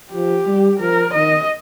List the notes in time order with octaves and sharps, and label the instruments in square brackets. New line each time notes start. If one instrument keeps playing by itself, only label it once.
[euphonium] F3 [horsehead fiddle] G4
[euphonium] G3
[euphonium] F3 [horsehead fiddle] A#4
[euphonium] D#3 [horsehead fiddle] D#5